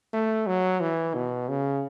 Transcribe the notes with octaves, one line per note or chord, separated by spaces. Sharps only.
A3
F#3
E3
B2
C#3